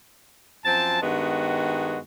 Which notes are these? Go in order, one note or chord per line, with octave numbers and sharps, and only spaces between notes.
F#2 F3 C4 A5
G2 D#3 G#3 B3 F#4